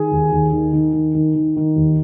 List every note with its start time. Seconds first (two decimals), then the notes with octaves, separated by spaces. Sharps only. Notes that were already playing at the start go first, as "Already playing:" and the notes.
Already playing: D#3 G#4 G#5
0.11 D#2
0.32 D#2
0.53 D#3
0.73 D#3
0.93 D#3
1.15 D#3
1.35 D#3
1.56 D#3
1.76 D#2